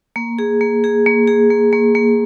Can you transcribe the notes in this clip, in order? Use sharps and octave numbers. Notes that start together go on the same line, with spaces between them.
A#3
G#4
A#3
G#4
A#3
G#4
A#3
A#3
A#3